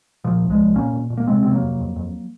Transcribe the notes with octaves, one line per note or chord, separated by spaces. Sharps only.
A#2 F3
C2
F3 G#3
C2
A#2 A#3 C#4
A#2
A#2
A#3
C3 G#3 C4
C3 C4
F#3 A#3
F2
F2
F2